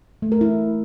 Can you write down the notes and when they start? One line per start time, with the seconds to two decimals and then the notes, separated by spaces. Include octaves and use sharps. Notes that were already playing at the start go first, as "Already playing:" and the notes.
0.22 A3
0.32 A#4
0.41 E4